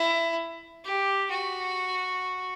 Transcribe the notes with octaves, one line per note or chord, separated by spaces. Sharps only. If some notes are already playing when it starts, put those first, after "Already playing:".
Already playing: E4
G4
F#4